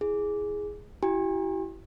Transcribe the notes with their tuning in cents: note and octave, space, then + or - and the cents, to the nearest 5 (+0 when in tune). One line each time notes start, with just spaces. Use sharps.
E4 +0 G#4 +0
E4 +15 G4 -40 G#5 -45